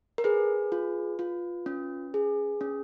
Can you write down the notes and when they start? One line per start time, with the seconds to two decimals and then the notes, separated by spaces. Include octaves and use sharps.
0.18 A#4
0.24 G#4 B4
0.72 F4
1.19 F4
1.66 C#4
2.14 G#4
2.61 C#4